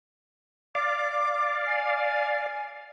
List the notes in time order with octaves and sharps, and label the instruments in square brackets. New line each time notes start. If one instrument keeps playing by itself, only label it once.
[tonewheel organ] D5 F5 [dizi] D6
[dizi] G#5